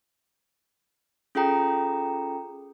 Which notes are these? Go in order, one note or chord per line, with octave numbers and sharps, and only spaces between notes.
C#4 F4 G#4 A4 G5 A#5